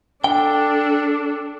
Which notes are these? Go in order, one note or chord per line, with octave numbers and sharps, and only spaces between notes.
D4 A4 G5